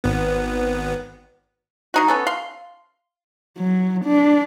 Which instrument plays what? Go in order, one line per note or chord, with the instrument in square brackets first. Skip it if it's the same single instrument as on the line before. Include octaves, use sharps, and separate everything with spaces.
[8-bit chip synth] G#1 B3
[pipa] F#3 D#4 F#4
B3 C#4 A4
F5 C6
[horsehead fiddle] F#3
D4